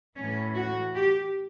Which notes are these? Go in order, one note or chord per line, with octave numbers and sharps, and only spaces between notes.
A2 E3 C#4
F#4
G4